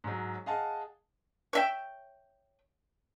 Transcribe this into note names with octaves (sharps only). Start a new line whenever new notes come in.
G#2 F#3
G#4 D#5 F5 F#5 G#5 A5
C#5 E5 G5